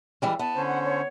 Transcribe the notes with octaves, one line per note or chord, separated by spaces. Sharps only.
E3 G3 G#3
B3 A5
D3 C#4 C5
F#5
C#5